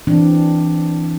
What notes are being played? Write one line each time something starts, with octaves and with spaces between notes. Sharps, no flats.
E3 C4 D4